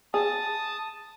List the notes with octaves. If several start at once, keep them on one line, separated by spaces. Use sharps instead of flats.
G#4 A5 D#6